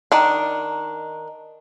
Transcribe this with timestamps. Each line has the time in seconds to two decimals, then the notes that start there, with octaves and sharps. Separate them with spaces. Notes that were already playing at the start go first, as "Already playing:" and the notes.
0.12 D#3 D4